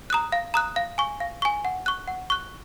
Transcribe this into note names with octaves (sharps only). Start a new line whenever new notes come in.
A#5 D#6 F#6
F5
A#5 D#6 F#6
F5
G#5 C#6
F5
G#5 C#6
F#5
C#6 F#6
F#5
C#6 F#6